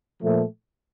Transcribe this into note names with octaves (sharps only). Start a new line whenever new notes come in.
A#2 F3 A3